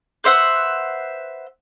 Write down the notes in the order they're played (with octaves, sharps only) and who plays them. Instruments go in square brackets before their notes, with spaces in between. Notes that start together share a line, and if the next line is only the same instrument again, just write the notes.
[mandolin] B4 C5 E5 F#5